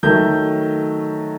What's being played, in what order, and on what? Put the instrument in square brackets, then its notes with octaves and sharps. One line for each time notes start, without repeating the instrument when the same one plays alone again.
[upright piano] D#3 F#3 A3 G6